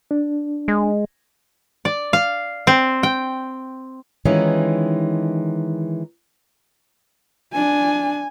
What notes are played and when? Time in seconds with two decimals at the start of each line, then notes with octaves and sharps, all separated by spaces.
0.11 D4
0.68 G#3
1.85 D5
2.13 F5
2.67 C4
3.03 G5
4.25 D#3 E3 G#3 C#4 D#4 F4
7.53 D4 G#5